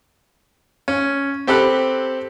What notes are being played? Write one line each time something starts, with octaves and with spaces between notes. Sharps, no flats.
C#4
C4 G4 A4 B5 F#6